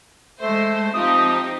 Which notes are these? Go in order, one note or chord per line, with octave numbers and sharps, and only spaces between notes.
G#3 A3 C5
F3 C4 D#4 G4 D#6